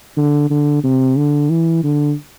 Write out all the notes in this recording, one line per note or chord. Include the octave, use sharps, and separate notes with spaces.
D3
D3
C3
D3
E3
D3